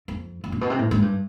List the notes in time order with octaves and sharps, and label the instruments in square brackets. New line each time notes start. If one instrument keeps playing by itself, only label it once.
[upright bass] F2
F#2
A#2
B2
C3
A2
G#2
G2